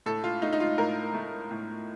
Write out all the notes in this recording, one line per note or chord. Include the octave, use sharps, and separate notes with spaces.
A2 A4
F4
A3 D#4
D#4
F4
A2 A#4
A3
A2